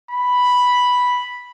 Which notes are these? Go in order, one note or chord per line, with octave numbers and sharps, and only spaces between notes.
B5